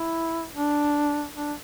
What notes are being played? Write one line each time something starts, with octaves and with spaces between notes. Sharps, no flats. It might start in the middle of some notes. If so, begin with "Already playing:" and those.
Already playing: E4
D4
D4